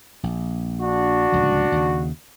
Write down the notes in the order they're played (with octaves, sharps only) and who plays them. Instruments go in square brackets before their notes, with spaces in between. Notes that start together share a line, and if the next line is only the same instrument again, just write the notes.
[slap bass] A#1
[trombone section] D4 F#4
[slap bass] D1 C#2 F3
D#2 C#3